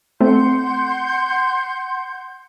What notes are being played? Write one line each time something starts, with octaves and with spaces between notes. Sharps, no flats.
A3 C4 F#5 C6 G6